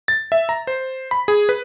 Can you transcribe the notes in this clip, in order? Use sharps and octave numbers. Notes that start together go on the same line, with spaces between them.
A6
E5
A#5
C5
B5
G#4
B4